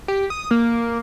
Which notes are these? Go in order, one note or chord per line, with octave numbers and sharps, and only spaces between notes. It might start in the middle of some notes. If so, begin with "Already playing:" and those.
G4
D#6
A#3